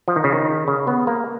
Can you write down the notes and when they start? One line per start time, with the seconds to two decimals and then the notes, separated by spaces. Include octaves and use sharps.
0.08 F3
0.16 D#3
0.24 C#3
0.32 D#3
0.68 C#3
0.87 B3
1.07 A#3